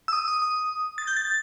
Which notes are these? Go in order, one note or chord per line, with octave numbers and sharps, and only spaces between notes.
E6
D#6
D#6
D#6
A6
G6
A6
A6